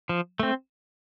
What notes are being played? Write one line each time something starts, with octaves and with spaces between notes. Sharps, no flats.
F3
A3 C4